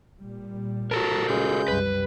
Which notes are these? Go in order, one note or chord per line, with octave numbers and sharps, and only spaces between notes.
A#2 G3
F#4 A4 A#4 A5 A#5
C#3 G#3 G6
C2 F#2 G3 B4